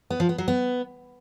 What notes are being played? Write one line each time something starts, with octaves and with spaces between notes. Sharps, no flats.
B3
F3
B3
F#3
B3